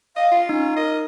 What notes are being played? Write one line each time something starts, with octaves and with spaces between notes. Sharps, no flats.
D#5 F5
F4
C#4 D#4
A#4 D#5